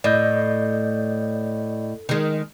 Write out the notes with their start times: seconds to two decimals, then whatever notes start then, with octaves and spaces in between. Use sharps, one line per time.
0.04 A2 D5 D#5 G6
2.09 D#3 G#3